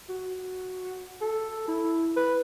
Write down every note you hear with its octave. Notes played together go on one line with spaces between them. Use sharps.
F#4
A4
E4
B4